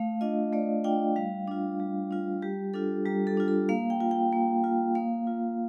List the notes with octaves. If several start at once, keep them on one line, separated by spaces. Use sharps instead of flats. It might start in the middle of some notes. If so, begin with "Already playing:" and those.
Already playing: A3 F5
D4 F4 D#5
A3 D5
D4 F4 G5
G3 F5
D4 F4
G3
D4 F4
G3 G4
D4 F4 A4
G3 G4
A4
D4 F4
A4
A#3 F5
G5
F4
G5
A#3
F4
A#3 F5
F4